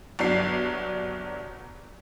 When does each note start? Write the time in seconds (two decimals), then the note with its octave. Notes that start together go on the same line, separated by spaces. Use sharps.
0.19 G1 F#3 D4 C7